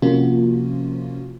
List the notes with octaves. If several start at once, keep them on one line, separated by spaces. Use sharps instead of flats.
C3 F3 A#3 C#4 F4 F#4